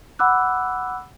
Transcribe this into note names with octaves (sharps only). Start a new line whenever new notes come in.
F#5 B5 D6 E6 F#6